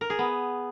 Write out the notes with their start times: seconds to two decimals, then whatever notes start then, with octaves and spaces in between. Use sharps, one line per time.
0.01 A#4
0.10 G#4
0.19 B3